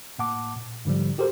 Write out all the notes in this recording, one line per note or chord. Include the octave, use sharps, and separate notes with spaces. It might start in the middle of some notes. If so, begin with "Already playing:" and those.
A2 A#3 F#5 A5 D6
A#2
G#2 D3 F3 G3
F#4 G4 A4 A#4 C5